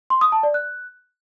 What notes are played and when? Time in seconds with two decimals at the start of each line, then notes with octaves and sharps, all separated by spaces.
0.10 C6
0.21 D#6
0.32 A5
0.43 D5
0.54 F#6